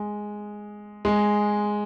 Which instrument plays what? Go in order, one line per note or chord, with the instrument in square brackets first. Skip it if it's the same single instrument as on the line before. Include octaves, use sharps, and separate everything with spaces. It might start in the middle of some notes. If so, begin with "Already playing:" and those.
Already playing: [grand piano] G#3
G#3